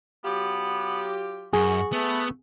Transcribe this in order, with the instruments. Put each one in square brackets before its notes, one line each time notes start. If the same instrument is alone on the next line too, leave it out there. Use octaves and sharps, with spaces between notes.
[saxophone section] F#3 F4 G4 [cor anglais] B3
[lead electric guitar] F#2 [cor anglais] F#4 [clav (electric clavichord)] G#4
[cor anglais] A3 [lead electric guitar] B3